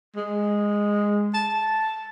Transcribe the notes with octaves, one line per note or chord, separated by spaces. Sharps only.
G#3
A5